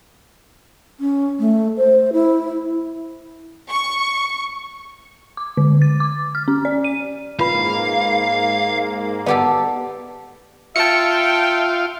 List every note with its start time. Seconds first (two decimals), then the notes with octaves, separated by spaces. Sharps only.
1.00 C#4
1.40 A3
1.77 C5
2.13 E4
3.70 C#6
5.37 D6
5.57 D3
5.82 A6
6.00 D6
6.35 F6
6.48 C#4
6.65 D5
6.84 D#7
7.40 G#2 A#3 F4 B4 F5 B5
9.26 B3 G4 A4 D5 F#5
10.76 F4 E5 G5 A5 C#7